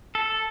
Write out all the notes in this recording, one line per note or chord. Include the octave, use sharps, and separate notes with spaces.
A4